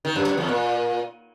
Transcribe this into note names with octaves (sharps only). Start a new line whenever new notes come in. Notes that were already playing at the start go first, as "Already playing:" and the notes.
D#3
F#2
F#2
E2
A#2